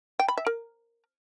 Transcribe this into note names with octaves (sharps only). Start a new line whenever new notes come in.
G5
B5
E5
A#4